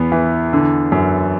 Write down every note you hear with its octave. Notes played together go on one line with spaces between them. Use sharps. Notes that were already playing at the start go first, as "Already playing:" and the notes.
Already playing: E2 B3
E3
D3
F#2